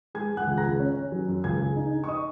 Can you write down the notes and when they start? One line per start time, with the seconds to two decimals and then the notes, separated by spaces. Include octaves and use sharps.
0.15 G#3 G#5 G#6
0.32 G#3
0.37 F#5 F#6
0.47 C#2
0.58 A#5 A#6
0.64 C#2
0.80 C#4
0.96 C#4
1.12 F#3
1.28 F#2
1.44 C#2 G#5 G#6
1.61 C#3
1.76 D#4
1.93 D#4
2.04 C#6
2.08 D#5 D#6